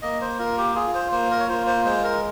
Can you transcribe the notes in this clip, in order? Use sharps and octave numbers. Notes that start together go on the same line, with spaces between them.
A#3 D#5
C5
F4 A#4
G4
F4 G#4
C5
A#3 C5
A#4
C#5
F4 C5
C5
G#3 C5
A#4